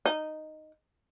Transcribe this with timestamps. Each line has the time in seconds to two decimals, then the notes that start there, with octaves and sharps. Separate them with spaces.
0.06 D#4